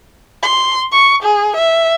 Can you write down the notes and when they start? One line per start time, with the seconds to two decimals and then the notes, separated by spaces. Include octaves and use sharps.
0.43 C6
0.92 C#6
1.23 G#4
1.56 E5